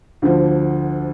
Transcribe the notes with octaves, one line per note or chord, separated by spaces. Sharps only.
D2 D3 F3